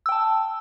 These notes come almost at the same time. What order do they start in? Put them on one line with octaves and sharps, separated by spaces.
E6 G5 A5